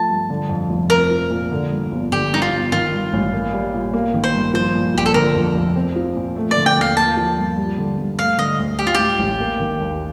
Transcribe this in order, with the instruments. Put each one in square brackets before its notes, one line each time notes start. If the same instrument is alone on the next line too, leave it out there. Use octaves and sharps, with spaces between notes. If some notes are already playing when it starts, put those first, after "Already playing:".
Already playing: [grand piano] F3 A3 [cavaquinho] A5
[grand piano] G2
D3
F2
F1
[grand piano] C4 [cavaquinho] A#4
[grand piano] F3
A#2
D3
G2
G1
[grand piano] D3 [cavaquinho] G4
[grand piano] G2 [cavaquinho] D#4
[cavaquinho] F4
[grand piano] G1
[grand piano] D#3 [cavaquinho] F4
[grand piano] G2
A1
A#3
G3
A#2
A#3
D#3
[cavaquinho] C5
[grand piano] G2
[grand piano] F3 [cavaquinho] C5
[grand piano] A#2
[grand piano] A#1 [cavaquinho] G4
[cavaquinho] A4
[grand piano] D3 [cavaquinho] A#4
[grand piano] F2
F1
C4
F3
A#2
A3
[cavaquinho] D5
[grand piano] D3
[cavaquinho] G5
[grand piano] D#2 [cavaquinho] F5
[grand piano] A#3 [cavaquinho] A5
[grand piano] F3
G2
G3
D3
G2
[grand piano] A3 [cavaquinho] F5
[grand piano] D3 [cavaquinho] D#5
[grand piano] D2
[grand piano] G3 [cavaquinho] G4
[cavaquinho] F4
[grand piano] A2 [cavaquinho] G4
[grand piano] A1
A#3
D#3
D#2